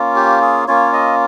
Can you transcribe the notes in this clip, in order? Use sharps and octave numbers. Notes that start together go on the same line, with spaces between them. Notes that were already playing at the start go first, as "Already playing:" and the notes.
Already playing: A#3 C#4 F4
G4
G#4
A#3 C#4 F4 C#5
D#5